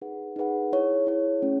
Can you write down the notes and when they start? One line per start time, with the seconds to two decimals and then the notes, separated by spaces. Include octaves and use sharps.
0.02 D#4 G#4 B4 F#5
0.36 D#4 G#4 B4 F#5
0.72 E4 G#4 C#5
1.07 E4 G#4 C#5
1.42 A3 C#4 G#4